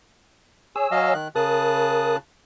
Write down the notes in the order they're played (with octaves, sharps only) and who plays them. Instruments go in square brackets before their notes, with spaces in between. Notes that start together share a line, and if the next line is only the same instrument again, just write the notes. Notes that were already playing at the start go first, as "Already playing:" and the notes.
[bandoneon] G#4 [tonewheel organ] C#5 G#5 E6
[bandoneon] F#3 D#5 F5
D#3 F#6
[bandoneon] C#3 A5 F#6 [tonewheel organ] A#4 D#6